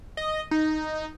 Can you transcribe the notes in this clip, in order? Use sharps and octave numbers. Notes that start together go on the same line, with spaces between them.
D#5
D#4